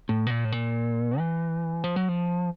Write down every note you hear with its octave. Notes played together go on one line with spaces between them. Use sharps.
A2
B2
A#2
A2
A#2
E3
F3
F#3
F3